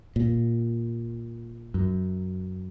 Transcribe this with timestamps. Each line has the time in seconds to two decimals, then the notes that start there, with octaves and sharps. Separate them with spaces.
0.16 A#2
1.74 F#2